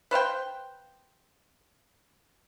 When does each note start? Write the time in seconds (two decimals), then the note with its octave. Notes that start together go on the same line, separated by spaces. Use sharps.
0.11 B4 C5 F5 G5